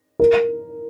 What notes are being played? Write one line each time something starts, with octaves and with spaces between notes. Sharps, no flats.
A#4